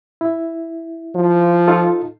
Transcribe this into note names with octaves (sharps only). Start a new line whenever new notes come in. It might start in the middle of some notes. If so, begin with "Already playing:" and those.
E4
F3
D#4 F4 A4